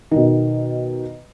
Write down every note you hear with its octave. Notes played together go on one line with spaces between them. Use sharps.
B2 D#3